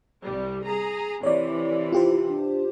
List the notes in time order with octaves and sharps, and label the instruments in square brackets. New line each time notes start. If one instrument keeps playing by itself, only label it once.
[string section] C2 G3
G#4 A#5
[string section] C3 E3 [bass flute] E4 [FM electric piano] C#5 D5
[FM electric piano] F4 G4 C5
[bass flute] D4